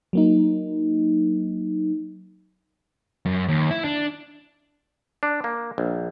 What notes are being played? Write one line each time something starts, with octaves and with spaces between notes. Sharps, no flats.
F#3 A#3 D#4
F#2
D#2
E4
D4
D4
A#3
A#1